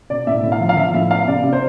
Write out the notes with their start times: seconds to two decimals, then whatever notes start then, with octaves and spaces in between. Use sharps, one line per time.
0.10 B2 D5
0.27 A2 E5
0.43 A2
0.52 F5
0.60 F3
0.69 F5
0.77 F3 E5
0.94 A2 E5
1.11 B3 F5
1.28 C3 D5
1.44 C3
1.53 C5